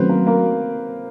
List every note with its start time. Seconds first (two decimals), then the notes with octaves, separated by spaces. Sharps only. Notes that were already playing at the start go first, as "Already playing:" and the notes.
Already playing: D#3 F#3 A3 C4 C#4 F#4 B4 C5
0.09 A#3 A#4
0.26 A#3 A#4